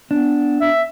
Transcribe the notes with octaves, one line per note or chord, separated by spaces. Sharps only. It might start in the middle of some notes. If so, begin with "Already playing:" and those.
B3 D4
E5